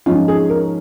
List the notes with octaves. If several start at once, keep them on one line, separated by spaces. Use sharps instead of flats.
G#2 F3 G#3 C#4 F4
G#4
A#4